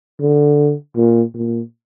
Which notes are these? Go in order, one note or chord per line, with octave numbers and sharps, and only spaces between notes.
D3
A#2
A#2